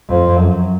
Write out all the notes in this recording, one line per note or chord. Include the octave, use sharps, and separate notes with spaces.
F2
F#2